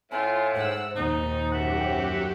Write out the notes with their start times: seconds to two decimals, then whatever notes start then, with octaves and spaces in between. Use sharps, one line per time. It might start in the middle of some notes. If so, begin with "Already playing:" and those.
0.12 A2 F4 G#5
0.54 G#2 C5 F#5 E6
0.96 D#2 A#2 D#4 C5
1.52 F#2 F#4 G4 E5 F#5